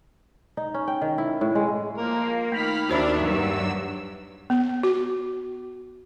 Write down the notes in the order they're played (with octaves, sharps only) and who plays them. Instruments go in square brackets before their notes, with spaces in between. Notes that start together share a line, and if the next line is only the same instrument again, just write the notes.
[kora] D#4
C#4
G5
D#3
E4
A2
G#3
[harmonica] F3 A#4 [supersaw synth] A#3
[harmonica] D#3 [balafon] A3 [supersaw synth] B5 F6 B6
[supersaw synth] D#2 E5 [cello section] D4 [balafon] F#4 C5 B5
[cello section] G2 [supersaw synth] F#3 E6
[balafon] B3
F#4